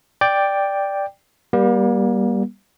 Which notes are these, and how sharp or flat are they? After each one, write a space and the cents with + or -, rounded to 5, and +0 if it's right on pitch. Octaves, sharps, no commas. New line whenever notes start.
D5 +0 G5 +5
G3 +0 A#3 +40